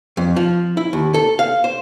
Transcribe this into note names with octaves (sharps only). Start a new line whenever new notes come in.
F2
F3
E4
D#2
A4
F5
C5